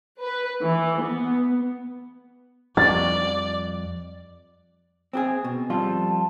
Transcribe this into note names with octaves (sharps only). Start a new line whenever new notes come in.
B4
E3
B3
F2 F3 G3 D5 C#6 A6
C4 G4 G#4
B2
F2 G3 F4 A5